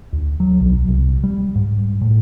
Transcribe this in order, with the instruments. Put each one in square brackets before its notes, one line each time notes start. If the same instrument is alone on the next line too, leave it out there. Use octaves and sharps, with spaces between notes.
[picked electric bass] D2
F#3
B1
C2
G3
G#2
A2